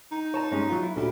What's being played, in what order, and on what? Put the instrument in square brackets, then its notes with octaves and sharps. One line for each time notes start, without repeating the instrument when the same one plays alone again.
[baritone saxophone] D#4
[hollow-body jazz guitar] C#5 A5 A#5
G2 G#3 C#4
F#3 F4
E4
[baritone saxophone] D2 [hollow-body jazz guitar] A#2 E4 G4